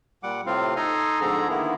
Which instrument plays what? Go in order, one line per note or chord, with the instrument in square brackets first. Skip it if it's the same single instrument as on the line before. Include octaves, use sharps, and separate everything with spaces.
[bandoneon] A#2 G3 F#5 D6
A2 C3 C4 F4 F5
D#4 A4 G#5 A#5 C6
F2 G#2 D3 G#4 A4 A#5
D3 D#3 A#3 B3 E4